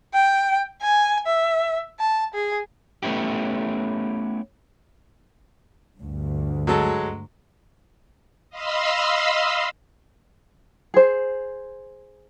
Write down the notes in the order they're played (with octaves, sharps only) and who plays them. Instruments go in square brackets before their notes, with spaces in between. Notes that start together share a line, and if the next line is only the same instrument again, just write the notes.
[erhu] G5
G#5
E5
A5
G#4
[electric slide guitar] A3 B3 C#4 E4 G4
[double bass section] D2 G2
[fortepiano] F#3 G#3 A4
[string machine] D#5 F5 B5 C6 E6
[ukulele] G#4 C5